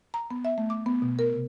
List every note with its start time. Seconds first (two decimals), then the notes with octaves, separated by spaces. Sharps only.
0.14 A#5
0.31 B3
0.45 E5
0.58 A3
0.70 D6
0.86 B3
1.02 B2
1.19 A#4
1.33 C3